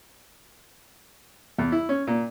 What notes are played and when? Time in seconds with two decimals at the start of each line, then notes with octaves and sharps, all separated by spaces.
1.58 E2
1.72 E4
1.89 C#4
2.07 A#2